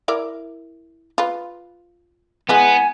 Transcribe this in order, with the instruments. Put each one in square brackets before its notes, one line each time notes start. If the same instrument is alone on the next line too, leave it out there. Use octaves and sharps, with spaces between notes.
[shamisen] E4 A#4 D5
F4 B4
[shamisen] E3 G#3 [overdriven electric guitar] B3 [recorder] G#5